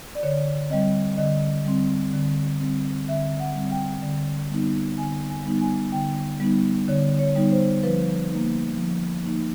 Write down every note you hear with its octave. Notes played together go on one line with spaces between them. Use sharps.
D5
D3 C#5
G3 C4 D#5
D3 D#5
G3 C4
D3
G3 C4
D3 E5
F#5
G3 C4
G5
D3
G3 B3 D#4
D3 G#5
G#5
G3 B3 D#4
G#5
D3 G5
G3 B3 D#4
D3 C#5
C#5
G3 B3 D#4
C5
F3 B4
A#3 D#4
F3
A#3 D#4